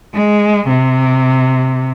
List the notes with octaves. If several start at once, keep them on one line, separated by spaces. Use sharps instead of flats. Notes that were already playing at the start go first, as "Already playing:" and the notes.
G#3
C3